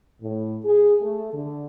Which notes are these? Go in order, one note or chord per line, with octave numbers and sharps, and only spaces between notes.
A2
G#4
A3
D3